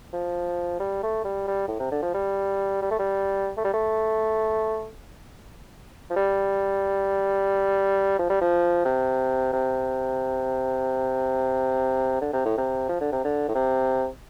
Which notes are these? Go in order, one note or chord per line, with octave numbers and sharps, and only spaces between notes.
F3
G3
A3
G3
G3
A2
C3
D3
F3
G3
G3
A3
G3
A3
G3
A3
F3
G3
F3
G3
F3
C3
C3
D3
C3
A2
C3
F3
D3
C3
D3
A2
C3